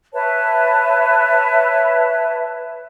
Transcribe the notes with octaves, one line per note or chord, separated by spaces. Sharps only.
B4 C#5 E5 A5